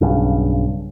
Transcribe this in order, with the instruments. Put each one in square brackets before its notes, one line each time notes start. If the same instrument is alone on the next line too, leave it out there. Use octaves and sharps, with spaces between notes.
[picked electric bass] B1 G2 C#3